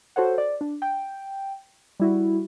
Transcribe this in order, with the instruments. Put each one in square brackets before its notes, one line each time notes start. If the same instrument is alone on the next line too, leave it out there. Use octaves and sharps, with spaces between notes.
[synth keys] F#4 A4 C5 C#5 F#5
D5
D4
G5
G3 E4 F#4